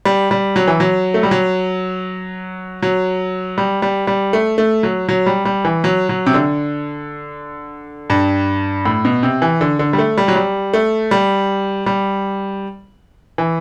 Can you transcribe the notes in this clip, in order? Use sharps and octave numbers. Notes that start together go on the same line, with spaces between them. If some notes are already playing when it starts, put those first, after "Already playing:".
G3
G3
F#3
E3
F#3
A3
G3
F#3
F#3
G3
G3
G3
A3
A3
F#3
F#3
G3
G3
E3
F#3
F#3
C3
D3
G2
A2
B2
C3
E3
D3
D3
G3
A3
G3
F#3
G3
A3
G3
G3
E3